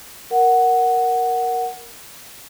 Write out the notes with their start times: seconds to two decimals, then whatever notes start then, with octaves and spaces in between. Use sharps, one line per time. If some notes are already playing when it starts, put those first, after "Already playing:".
0.31 A#4 F#5